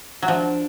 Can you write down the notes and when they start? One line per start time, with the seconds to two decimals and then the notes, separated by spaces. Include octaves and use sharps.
0.22 F#3
0.28 F3 D4